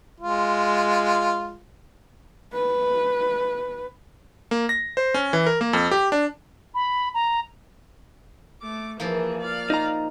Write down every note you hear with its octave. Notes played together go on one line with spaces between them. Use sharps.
G#3 F4
B4
A#3
A#6
C5
C#4
E3
A#4
A#3
F2
G4
D4
B5
A#5
A3 D6
E3 F3 A#3 G#4
D5 F5
D#4 A#5